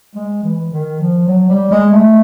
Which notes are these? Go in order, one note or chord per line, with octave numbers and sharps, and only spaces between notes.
G#3
E3
D#3
F3
F#3
G3
G#3
A3